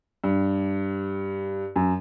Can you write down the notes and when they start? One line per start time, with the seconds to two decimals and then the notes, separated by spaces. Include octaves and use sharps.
0.24 G2
1.76 F#2